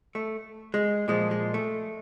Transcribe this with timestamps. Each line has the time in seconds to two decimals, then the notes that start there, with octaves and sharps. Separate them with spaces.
0.15 A3
0.74 G#3
1.08 A#2 F3 G#3
1.31 G#3
1.54 A3